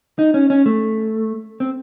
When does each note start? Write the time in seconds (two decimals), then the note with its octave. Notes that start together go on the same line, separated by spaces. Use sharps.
0.19 D#4
0.34 C#4
0.50 C#4
0.66 A3
1.60 C4